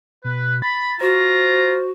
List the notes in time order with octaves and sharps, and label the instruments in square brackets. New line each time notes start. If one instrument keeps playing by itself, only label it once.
[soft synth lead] B2 [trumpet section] B4
[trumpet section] B5 [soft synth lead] A6
[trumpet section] F4 A#5 [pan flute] F#4 [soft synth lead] C5